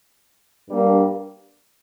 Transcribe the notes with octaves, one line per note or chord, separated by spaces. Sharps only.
G2 G3 A#3